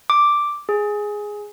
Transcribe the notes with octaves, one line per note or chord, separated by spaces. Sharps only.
D6
G#4